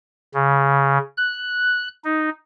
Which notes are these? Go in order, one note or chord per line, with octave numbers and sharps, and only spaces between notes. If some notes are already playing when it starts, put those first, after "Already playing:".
C#3
F#6
D#4